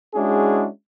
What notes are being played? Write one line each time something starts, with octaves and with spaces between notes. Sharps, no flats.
G#3 C#4 D4 E4 F#4 G#4